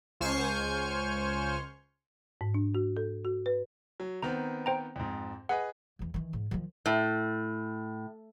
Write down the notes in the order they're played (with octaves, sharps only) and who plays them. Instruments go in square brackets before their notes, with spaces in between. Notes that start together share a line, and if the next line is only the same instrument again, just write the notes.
[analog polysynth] C#2 C5 G#5 C#6 F6 G6
[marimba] G#2
D4
F#4
A4
F#4
B4
[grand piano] F#3
[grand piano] D#3 B3 C4 [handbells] A#5
[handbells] C5 G5 A#5
[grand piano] F2 G#2
[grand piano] G#4 B4 D#5 [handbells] F#5
[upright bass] E2 E3
D#3 E3
G#2
D#3 F3
[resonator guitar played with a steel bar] A2